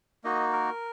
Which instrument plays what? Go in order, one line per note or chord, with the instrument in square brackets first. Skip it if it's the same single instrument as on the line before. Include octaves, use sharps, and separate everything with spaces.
[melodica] A#3 D#4 F#4 D#5
A#4